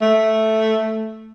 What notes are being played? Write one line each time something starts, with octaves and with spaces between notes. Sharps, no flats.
A3